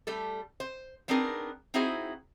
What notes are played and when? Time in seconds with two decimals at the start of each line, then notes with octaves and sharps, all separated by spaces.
0.07 G3 A3 A4
0.60 C5
1.08 B3 C4 D4 D#4 G#4 A#4
1.74 C4 D#4 E4 F#4 G#4 C5